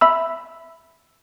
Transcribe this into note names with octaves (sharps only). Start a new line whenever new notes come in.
E5 B5 E6